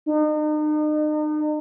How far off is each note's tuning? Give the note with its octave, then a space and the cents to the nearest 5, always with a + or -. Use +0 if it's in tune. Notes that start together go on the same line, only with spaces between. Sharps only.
D#4 -40